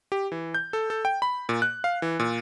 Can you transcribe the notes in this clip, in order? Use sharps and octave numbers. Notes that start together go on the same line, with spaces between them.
G4
E3
G6
A4
A4
G5
B5
A#2
F#6
F5
E3
A#2